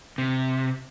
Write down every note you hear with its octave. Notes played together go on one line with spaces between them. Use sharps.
C3